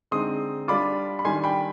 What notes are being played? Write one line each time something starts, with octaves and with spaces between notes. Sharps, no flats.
D3 G#3 C4 D#4 C6 D#6
G3 D4 F4 B5 D6
B5
D#3 G3 D4 G#5 C6
G5 B5